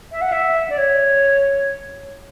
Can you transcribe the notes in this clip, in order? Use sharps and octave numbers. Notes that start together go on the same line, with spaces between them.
E5
F#5
E5
D5
C#5